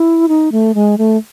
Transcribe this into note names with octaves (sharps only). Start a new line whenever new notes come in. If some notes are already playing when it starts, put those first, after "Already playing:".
Already playing: E4
D#4
A3
G#3
A3